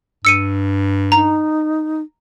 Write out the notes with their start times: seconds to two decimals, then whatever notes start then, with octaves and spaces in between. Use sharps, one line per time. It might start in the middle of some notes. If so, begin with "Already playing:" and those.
0.25 G2 E6 C#7 D#7
1.12 D#4 A#5